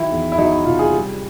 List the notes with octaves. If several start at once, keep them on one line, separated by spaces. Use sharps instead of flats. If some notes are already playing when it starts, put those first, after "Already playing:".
Already playing: D#3 F#3 E4
E2
E4
F#3 D#4
E4
C3 F4
G#4
G3